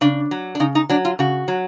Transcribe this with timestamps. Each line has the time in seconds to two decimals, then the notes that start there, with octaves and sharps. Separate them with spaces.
0.01 C#3 D4
0.31 F#3
0.55 D4
0.60 C#3 D#4
0.75 D#4
0.90 F#3 D4
1.05 F4
1.19 C#3 F#4
1.48 F#3